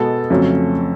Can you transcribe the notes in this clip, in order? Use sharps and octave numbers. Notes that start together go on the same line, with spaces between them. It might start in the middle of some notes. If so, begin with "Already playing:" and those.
Already playing: B2 G#3 B3 A4
F2 C#3 F#3 A3 C#4